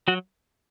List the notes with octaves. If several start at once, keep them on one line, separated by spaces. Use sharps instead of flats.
F#3 F#4